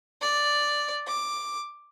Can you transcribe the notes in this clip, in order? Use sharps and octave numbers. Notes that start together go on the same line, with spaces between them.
D5
D6